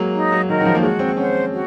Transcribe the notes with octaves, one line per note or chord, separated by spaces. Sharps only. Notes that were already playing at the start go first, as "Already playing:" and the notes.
Already playing: F#3 G#3 A#3
D#4
F#3
D#3 A#4 D#5 F#5
D#3
F3
A#3
G#3 F#4
C4
C#4 C5 F#5
F#4